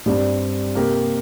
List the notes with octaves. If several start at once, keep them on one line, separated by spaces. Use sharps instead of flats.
G2 G3 C4
C3 A#3 G4 A#4